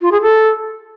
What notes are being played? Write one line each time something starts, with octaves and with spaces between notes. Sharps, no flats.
F4
G#4
A4